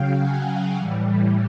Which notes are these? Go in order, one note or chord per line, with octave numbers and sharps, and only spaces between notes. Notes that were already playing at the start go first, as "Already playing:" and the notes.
Already playing: C#3 F#3 F5 G5
F#5 G#5
A2 E3 G3